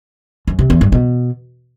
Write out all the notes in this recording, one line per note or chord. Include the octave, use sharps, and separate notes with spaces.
F#2
C3
E2
G2
B2